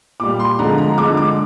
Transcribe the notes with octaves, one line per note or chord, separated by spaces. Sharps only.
A#2 G3 D6
C6
D3 F3 G#3 A#5
A#5
D3 G#3 D6
D6